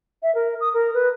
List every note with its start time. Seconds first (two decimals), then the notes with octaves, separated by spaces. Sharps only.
0.23 E5
0.35 A#4
0.61 D#6
0.74 A#4
0.94 B4